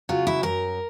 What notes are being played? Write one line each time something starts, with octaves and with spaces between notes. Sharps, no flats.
C#3 F#3 F4
E4
F#2 A#4